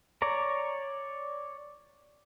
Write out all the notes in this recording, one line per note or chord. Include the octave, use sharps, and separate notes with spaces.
C#5 D5 A#5